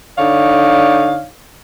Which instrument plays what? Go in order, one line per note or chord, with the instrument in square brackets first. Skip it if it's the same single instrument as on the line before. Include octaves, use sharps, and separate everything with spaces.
[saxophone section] D3 D#4 C#5 D5 F5